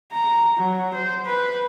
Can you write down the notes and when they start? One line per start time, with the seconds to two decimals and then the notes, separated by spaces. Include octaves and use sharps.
0.13 A#5
0.57 F#3
0.94 C5
1.26 B4